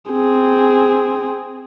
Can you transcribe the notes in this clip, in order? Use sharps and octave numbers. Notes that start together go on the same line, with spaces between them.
C4 G#4